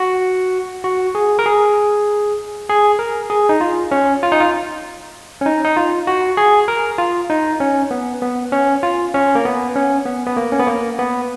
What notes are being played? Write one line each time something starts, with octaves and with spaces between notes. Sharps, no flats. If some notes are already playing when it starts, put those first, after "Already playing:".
Already playing: F#4
F#4
G#4
A#4
G#4
G#4
A#4
G#4
D#4
F4
C#4
F4
D#4
F4
C#4
D#4
D#4
F4
F#4
G#4
A#4
F4
D#4
C#4
B3
B3
C#4
F4
C#4
A#3
B3
C#4
B3
B3
A#3
C#4
B3
A#3
B3